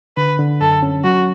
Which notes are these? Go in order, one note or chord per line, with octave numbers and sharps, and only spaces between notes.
D3 B4
D3
F#2 A4
C#4
F#3 F#4